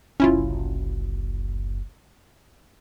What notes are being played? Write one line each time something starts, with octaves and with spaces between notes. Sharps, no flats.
F#1 C2 C#4 E4 F4